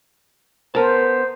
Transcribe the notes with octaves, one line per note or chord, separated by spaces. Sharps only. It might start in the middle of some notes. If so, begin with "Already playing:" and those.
B3 A#4 C5 A5